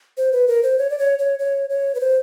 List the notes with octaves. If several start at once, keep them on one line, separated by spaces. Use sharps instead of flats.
C5
B4
A#4
C5
C#5
D5
C#5
C#5
C#5
C#5
B4
C5